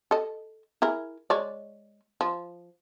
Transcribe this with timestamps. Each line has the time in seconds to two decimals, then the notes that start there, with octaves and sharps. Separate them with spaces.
0.11 A4 D#5
0.82 E4 G#4 A#4
1.30 G#3 C#5 D5
2.21 F3